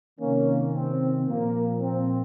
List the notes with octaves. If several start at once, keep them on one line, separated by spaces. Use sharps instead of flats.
C3 D#3 A#3 C#4
C4
A#2 F3 A#3
C4